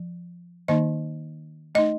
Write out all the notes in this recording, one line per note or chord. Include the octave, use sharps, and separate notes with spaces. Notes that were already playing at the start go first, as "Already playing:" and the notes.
Already playing: F3
D#3 A#3 D#4 D#5
A3 D#4 D#5